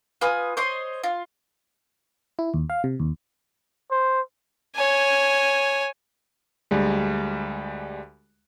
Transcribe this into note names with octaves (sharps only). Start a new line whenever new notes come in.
F4 B4 G#5 D#6
C5 C#5 D#5 C6
F4
E4
D#2
F5
C3
D#2
C5
C#5 G#5
D2 G3 G#3